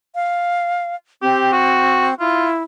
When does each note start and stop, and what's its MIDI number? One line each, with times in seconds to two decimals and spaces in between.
0.15 0.95 77
1.22 2.14 60
1.22 1.48 67
1.52 2.08 66
2.20 2.63 64
2.20 2.48 65